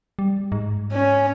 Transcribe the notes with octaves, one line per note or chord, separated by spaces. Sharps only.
G3
G#2
C#4